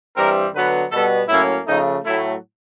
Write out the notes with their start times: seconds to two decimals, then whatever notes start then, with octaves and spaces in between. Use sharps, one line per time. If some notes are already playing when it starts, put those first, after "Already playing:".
0.16 G2 E3 G3 C4 A#4
0.53 D3 F#3 B3 B4
0.92 B2 G3 B3 A4
1.29 A2 F#3 A#3 C#4 E4
1.66 C#3 F3 A3 D#4
2.04 A2 F#3 A3 E4